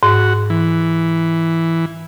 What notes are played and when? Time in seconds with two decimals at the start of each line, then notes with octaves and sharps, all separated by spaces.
0.03 G#2 F#4
0.50 E3